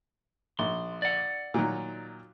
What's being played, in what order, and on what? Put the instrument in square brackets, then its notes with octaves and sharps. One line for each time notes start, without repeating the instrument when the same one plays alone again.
[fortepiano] A#1 [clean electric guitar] C6
[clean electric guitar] D5 F#5
[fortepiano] A#2 D#3 F#3